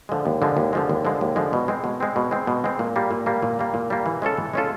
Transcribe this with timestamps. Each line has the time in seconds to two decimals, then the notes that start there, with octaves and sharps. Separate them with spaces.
0.09 D3 F3 G#3
0.25 D#2
0.42 D3 F3 G#3
0.57 D#2
0.73 D3 F3 G#3
0.89 D#2
1.05 D3 F3 G#3
1.21 D#2
1.36 D3 F3 G#3
1.53 B2
1.68 G#3 C4
1.84 B2
2.00 G#3 C4
2.16 B2
2.31 G#3 C4
2.47 B2
2.64 G#3 C4
2.79 A#2
2.96 G3 A#3
3.11 A#2
3.26 G3 A#3
3.42 A#2
3.59 G3 A#3
3.74 A#2
3.90 G3 A#3
4.06 E3
4.22 G#3 C#4 F4 A4
4.37 E3
4.53 G#3 C#4 F4 A4